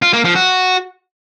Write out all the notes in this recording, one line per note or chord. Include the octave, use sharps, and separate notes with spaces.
F4
A#3
F3
F#4